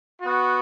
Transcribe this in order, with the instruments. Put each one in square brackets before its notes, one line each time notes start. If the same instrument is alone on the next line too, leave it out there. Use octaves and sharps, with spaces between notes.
[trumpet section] B3 F#4